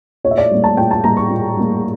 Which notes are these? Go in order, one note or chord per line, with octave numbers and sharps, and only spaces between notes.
A#2 C#5
E5
D5
G3 A#3
A5
A#2 G5
A5
G3 A#3 A#5
C#6
A#2
G3 A#3